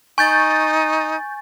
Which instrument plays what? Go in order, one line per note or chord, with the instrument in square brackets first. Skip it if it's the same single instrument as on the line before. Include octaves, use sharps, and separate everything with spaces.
[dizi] D#4 [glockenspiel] G#5 [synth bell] C#6 G6 A6